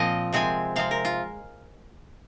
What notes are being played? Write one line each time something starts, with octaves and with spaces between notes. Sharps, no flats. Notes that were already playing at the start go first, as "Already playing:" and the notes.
Already playing: A#2 F3 C4 D#5
C3 G#3 C4 G#5
C3 G#3 C4 F5
A#4
F4